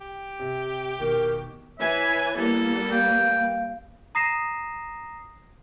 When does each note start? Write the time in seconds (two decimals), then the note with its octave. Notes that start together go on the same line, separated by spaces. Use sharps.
0.01 G4
0.39 C3
1.00 F1 B2 D#3 A#4
1.79 E3 C#5 E5 G#5
2.37 G3 A#3 B3 E4 A4
2.92 F5 G5
4.15 A#5 D#6 A#6 C7 D#7 E7